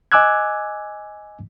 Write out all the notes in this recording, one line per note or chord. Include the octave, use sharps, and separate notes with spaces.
D#5 G#5 D6 E6 F#6 G#6